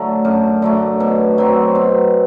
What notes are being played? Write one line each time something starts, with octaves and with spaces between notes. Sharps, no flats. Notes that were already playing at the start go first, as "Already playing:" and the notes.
Already playing: D3 F#3 A3
F#2
D3 F#3 A3
B2
F#3 C4
B2